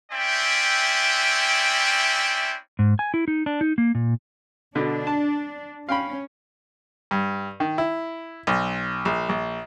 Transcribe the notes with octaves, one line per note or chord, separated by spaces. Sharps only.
C4 C#4 E4 D5 E5 G5
G#2
G#5
E4
D#4
D4
D#4
A#3
A#2
B2 D3 D4
A5
C#4 F5 G5 B5
G2
D#3
E4
B1
A#1
A#1